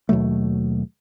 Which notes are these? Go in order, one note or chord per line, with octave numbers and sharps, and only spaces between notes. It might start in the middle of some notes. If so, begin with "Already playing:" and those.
D#2 B2 F#3 A3